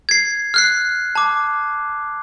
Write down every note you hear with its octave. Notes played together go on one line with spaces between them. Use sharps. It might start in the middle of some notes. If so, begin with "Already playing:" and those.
G#6 C7
F6 F#6 C7
A5 D6